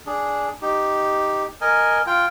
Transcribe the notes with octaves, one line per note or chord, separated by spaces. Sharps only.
D4 G#4
D#4 G4
A#4 D#5 G#5
F4 G5